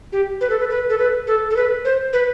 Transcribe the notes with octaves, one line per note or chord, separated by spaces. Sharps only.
G4
B4
A4
B4
B4
A4
B4
A4
A4
B4
C5
B4